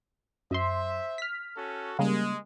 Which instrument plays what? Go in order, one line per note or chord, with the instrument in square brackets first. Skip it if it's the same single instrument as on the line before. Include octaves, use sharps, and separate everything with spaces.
[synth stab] F#2 C6 [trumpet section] C5 E5
[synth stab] F6 B6
[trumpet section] C#4 F#4 A4
[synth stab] C#3 G3 A#3 [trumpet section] G#3